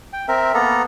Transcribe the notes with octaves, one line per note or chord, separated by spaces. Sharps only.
G5
C4 A#4 E5
A#3 B3 A4 A#5